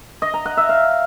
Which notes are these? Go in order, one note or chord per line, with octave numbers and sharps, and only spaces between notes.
D#5
A#5
F#5
E5
F5